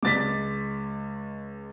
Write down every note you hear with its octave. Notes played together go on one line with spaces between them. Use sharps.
C#2 G#3 D6 A6 B6